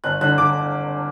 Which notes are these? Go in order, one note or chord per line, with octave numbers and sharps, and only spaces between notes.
G1 F#6
D3 F#6
D3 D6